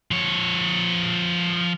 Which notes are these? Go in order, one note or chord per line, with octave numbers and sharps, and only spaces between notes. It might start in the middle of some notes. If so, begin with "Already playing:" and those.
F3 C#5